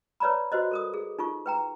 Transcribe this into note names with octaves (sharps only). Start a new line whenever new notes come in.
B4 C#5 D5 A#5 B5
F#4 B4 C5 D#5
A4 A#4 D#6
G#4
D#4 F4 C#6
B4 G5 A#5